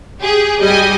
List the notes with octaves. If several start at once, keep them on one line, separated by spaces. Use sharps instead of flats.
G4 G#4
G#1 G3 G4 D#5 G#5